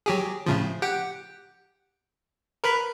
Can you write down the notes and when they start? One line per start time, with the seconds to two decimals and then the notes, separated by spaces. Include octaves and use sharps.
0.06 F#3 G4 G#4
0.46 A2 C#3 F3
0.82 G4 F#5 G5
2.64 A#4 B4 B5